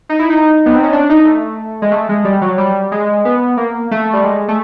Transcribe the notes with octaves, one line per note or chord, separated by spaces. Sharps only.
D#4
E4
D#4
B3
C4
C#4
D4
D#4
A3
G#3
A3
G#3
G3
F#3
G3
G#3
B3
A#3
A3
G3
G#3
A3